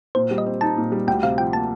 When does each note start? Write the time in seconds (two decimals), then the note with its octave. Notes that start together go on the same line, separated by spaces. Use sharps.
0.15 A#2 C5
0.31 G3
0.38 D#5
0.46 C4
0.61 D#4 A5
0.77 A#2
0.92 G3
1.07 D2 G5
1.23 C3 F5
1.38 F3 G5
1.53 A#3 A5